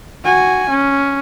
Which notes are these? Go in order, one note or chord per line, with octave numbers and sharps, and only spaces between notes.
F#4 G#5
C#4